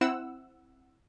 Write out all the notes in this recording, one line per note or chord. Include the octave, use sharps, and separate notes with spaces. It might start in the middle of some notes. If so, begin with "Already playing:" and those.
C4 E4 F#5 E6